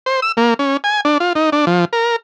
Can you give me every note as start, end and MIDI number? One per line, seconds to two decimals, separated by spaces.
0.06 0.20 72
0.22 0.32 88
0.37 0.54 58
0.59 0.77 61
0.84 1.01 80
1.05 1.18 62
1.20 1.33 65
1.35 1.50 63
1.52 1.65 62
1.67 1.85 53
1.93 2.16 70